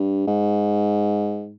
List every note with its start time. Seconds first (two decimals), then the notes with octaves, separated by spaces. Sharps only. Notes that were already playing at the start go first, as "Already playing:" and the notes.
Already playing: G2
0.27 G#2